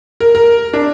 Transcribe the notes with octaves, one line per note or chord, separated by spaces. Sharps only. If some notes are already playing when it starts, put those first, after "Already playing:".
A#4
A#4
D4